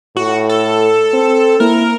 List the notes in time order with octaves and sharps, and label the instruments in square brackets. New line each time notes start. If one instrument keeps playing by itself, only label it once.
[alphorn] A2 [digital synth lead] F#4
[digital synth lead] A4
[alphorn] C4
[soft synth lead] A#3 [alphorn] E4 [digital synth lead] A#4